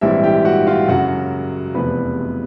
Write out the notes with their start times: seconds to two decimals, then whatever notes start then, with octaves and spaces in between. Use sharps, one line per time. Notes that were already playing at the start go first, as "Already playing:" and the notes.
0.01 A#1 G#2 E3 G3 C4 E4 E5
0.24 G4 G5
0.45 F#4 F#5
0.67 F4 F5
0.88 F#2 C#3 F#3 F#4 F#5
1.74 F1 E2 C3 F3 B4 B5